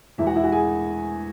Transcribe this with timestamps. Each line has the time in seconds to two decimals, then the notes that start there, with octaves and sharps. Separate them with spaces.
0.18 E2 B2 G#3 E4 E5
0.26 F#4 F#5
0.35 E4 E5
0.43 F#4 F#5
0.52 G#4 G#5